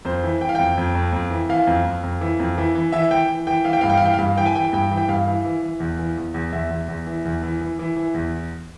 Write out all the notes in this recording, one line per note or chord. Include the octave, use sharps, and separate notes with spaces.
F2 C5
E3
E3 G5
F5
F2 G5
F2
F2
F2
E3
E3 F5
F2
F2
F2
E3
F2
E3
E3
E3 E5
E3 G5
E3
E3 G5
E3 F5
G5
G2 F5
G5
F5
E3 G5
G2 F5
E3 G5
G#5
E3 G5
G#5
G2 G5
E3
G5
G2 F5
E3
E3
E3
E2
E3
E2
E2
E2 E5
E2
E2
E3
E2
E3
E3
E3
E3
E2